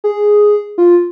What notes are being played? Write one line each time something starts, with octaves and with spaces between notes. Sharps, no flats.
G#4
F4